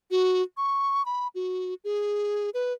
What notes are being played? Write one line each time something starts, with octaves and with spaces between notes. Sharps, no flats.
F#4
C#6
B5
F#4
G#4
B4